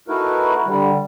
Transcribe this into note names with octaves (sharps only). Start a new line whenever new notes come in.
A3 D#4 E4 F#4 A#4 B4
D3 G3